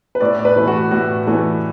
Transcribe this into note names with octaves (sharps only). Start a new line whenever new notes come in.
B4
A2 D5
D5
B4
E3 A3
F#4
A2 F#4
E3 A3